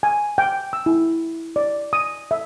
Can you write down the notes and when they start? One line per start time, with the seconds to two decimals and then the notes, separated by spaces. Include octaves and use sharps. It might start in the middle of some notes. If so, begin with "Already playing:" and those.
0.03 G#5
0.38 G5
0.73 E6
0.86 E4
1.56 D5
1.93 D#6
2.31 E5